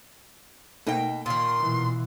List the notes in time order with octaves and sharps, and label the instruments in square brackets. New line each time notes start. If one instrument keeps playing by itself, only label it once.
[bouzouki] B2 G5 [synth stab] A3 A#3 D#4
[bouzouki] A#2 D#3 [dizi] C6
[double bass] B2 E3